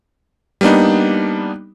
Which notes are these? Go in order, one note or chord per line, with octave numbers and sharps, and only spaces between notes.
G3 A#3 B3 D4 D#4